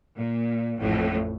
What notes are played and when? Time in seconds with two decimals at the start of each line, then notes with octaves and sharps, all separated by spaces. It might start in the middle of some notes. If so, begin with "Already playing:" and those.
0.16 A#2
0.78 A1 F2 A2